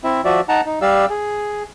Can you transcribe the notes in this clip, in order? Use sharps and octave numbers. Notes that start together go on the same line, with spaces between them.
C4 E4 E5
F3 F#4 D5 E5
D#4 F#5 A5 A#5
D#4
G3 G4 D5 F5 E6
G#4